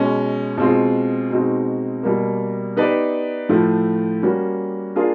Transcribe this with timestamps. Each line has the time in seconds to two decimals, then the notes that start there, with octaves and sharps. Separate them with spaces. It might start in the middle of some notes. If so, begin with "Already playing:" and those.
Already playing: B2 G#3 C#4
0.57 B2 G#3 C4 F4 G#4
1.30 B2 G#3 C4 D#4 F#4
2.03 B2 G3 A#3
2.77 B3 D#4 G4 B4 D5
3.49 A2 F3 A3
4.22 G3 A#3 C#4 F#4
4.95 A#3 D4 F4 G#4